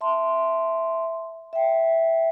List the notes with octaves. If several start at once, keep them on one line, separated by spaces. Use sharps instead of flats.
E5 A5 C6
E5 G5